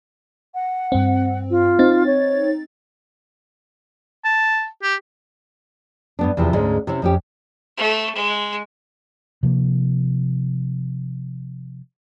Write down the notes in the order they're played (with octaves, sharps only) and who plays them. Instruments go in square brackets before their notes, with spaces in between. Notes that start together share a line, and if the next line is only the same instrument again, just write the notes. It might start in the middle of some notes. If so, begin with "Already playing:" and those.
[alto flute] F#5
[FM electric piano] G2 C4
[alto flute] F4
[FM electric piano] C4 D#4 A6
[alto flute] C#5
[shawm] A5
G4
[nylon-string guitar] G2 B3 D4
E2 C3 F3 E4
D2 G#2 G#3 C#4
C3 C4 C#4 E4
F2 C#4 G4
[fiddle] A3
G#3
[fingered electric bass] C3 F3 A#3